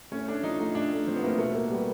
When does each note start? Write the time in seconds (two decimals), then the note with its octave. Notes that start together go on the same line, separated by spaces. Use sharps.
0.11 A2 C#4
0.27 A3 D4
0.43 F3 D#4
0.59 A2 D#4
0.75 A2 D4
0.92 A3
1.07 F3 C4
1.16 B3
1.23 A2 A#3
1.38 B2 A3
1.55 A3 A#3
1.70 G3 B3